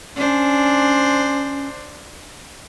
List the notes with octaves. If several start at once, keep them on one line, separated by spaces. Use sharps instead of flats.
C#4 D4 C5